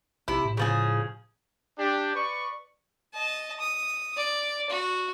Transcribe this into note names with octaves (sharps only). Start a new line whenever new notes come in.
A#1 C3 E4
A2
C#3 F3 G#4
D4 G4
B4 D5 C#6
D#5 A5
D#6
D5
F#4